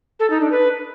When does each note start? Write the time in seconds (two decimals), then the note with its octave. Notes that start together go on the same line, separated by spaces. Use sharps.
0.20 A4
0.30 D#4
0.41 D4
0.51 B4